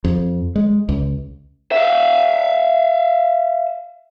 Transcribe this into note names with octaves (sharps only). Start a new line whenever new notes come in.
F2
G#3
C#2
E5 F5